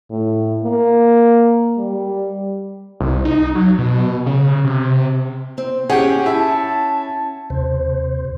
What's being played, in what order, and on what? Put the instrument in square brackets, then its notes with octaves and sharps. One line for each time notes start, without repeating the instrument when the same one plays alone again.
[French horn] A2
A#3
G3
[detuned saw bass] C2
D#4
F#3
B2
C#3
C3
[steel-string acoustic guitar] C4
[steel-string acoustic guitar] C#4 F#5 [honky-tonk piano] G4 G#4
[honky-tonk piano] E4 [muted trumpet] A5
[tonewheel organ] D#2 C3 C5